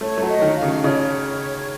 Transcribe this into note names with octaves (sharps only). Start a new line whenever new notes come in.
A3 C#5
A3
F#3
D#5
D#3
F5
C#3
C#3 C#5 D#5